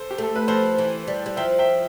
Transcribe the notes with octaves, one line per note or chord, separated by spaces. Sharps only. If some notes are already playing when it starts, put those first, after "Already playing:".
Already playing: A4 C5
G4
A3 A4
B4
F3 A4 C5
E3
G3
G3
F3 E5 G5
E5 G5